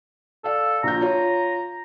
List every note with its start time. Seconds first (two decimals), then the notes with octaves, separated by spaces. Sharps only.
0.44 A4 D5 F5
0.83 A#1 F4 A#5 G6
1.01 F4 C#5